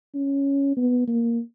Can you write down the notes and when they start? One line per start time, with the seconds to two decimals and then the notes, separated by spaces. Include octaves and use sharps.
0.14 C#4
0.77 B3
1.08 A#3